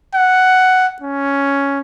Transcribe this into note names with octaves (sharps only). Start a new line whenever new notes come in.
F#5
C#4